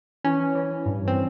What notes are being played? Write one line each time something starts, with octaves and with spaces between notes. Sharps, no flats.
E3 C#4
E3
G2
C4